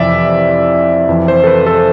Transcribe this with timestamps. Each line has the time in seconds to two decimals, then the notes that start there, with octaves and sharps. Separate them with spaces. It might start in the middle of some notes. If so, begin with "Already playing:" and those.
Already playing: F2 C3 E3 D5 E5
1.09 F2 E3
1.28 C5
1.44 A4
1.47 B4
1.67 A4